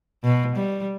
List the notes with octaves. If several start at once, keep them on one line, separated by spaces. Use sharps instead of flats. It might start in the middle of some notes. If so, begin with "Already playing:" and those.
B2
G3